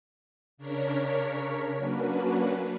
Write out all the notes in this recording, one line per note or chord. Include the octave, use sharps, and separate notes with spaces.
C#3 D4 A#4 C#5 B6
F#3 A#3 C#4 D4 F#4 B4